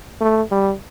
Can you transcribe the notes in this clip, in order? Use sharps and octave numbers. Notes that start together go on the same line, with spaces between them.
A3
G3